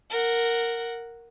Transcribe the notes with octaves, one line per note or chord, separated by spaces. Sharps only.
A#4 F#5